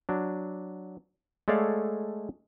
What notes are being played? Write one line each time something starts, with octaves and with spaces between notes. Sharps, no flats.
F#3 D4
G#3 A3 A4 C#5 D5 F5